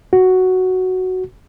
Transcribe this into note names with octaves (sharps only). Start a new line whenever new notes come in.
F#4